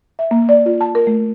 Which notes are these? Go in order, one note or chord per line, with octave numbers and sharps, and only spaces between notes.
E5
A#3
D5
F4
A5
A#4
A3